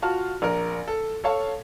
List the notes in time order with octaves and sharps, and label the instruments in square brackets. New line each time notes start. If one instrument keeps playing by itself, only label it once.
[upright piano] F4 F#4 A5 F6
A#1 A#4
A4
A4 C#5 F5 A5